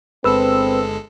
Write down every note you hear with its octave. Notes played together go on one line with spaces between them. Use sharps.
G1 G#3 C4 A4 B4 E6